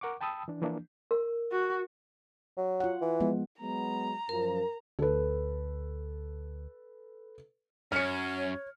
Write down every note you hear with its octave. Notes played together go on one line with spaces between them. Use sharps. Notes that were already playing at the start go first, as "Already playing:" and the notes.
A#4 F#5 C#6 D6
G5 A5 B5 D#6 E6
E3 D4
E3 F3 A#3 D4
A#4
F#4
F#3
F4 F#5
E3
F3 G#3 B3
F#3 G#3 B3 A#5
F#2 F3 A#4
D2 A4 B4
F#2 C#4 C#5 F6 C#7